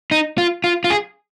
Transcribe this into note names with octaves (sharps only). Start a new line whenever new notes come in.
D#4
F4
F4
F4
G#4